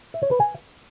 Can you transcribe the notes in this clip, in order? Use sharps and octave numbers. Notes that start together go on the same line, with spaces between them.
E5
C#5
B4
G#5